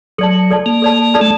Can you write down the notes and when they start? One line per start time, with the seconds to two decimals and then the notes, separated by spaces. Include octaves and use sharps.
0.18 F#3 A4 D5 A5
0.50 A4 D5 A5
0.66 A#3
0.82 A4 D5 A5
1.14 A4 D5 A5
1.21 A3